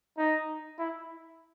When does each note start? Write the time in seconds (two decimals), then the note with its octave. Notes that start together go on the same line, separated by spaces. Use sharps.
0.18 D#4
0.79 E4